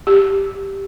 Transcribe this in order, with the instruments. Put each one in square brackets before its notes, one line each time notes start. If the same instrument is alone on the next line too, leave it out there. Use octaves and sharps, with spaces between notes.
[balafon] G4